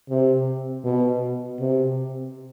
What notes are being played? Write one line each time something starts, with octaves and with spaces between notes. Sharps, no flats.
C3
B2
C3